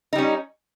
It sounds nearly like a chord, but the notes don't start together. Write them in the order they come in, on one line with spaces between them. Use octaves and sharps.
D#4 G3 C#4